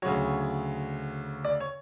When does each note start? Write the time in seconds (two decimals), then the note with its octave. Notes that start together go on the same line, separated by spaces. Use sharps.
0.02 D2 C#3 F#3 C#5
1.44 D5
1.60 C#5